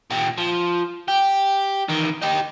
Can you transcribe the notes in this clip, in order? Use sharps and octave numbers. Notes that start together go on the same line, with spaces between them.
A#2 G4
F3
G4
E2 D#3
D#4 G4